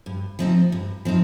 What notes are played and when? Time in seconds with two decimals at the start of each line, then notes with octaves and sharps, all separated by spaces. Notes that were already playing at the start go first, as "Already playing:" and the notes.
0.06 G2
0.39 F3 C4 D#4
0.72 G2
1.05 F3 C4 D#4